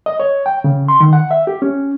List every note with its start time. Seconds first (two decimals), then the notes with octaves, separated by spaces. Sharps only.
0.06 D#5
0.20 C#5
0.46 G5
0.64 C#3
0.88 C6
1.01 D#3
1.13 F#5
1.31 E5
1.47 G4
1.62 C#4